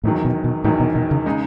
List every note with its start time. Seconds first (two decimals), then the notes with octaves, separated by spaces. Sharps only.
0.04 E1 E2 A2 D#3 F#3
0.25 B2
0.44 B2
0.64 E1 E2 A2 D#3 F#3
0.80 B2
0.95 B2
1.11 C#3
1.26 C#3 G#3 D#4